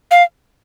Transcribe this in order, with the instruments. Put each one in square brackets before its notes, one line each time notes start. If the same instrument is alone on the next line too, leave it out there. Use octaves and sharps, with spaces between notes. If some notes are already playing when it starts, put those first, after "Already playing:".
[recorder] F5